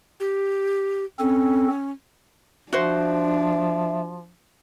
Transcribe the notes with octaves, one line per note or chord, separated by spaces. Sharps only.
G4
C4 C#4 A4
F3 D4 F#4 C5 E5